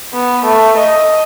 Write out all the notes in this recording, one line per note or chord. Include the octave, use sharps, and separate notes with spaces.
B3
A3
D#5